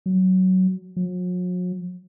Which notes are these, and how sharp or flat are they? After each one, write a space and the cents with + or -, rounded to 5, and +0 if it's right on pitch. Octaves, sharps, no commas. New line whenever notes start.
F#3 +10
F#3 -45